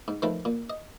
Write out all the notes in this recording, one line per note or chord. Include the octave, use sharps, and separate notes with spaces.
G#2
D#3 F3 A3 A#4 B4
A#2
D#5